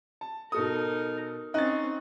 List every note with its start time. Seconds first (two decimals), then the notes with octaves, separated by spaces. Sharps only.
0.21 A5
0.52 B2 D#4 A4 A#4 D#6
1.54 C4 C#4 D#4 F#6 A6